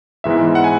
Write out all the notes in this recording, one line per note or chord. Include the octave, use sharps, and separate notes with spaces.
G#2 E3 G#3 B3 E5
F#5
G#5